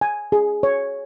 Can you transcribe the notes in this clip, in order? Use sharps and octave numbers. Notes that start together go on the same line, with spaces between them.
G#5
G#4
C#5